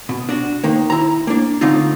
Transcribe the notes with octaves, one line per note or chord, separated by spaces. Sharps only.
B2
D4 F#4
D#3 A#3
E4 A#5
A#3 D4
A2 D3 C4 D#4 F4